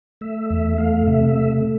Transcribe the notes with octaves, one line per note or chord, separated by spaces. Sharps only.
A3 E5
E2 E5
A3 F5
C3 E5
E5
A3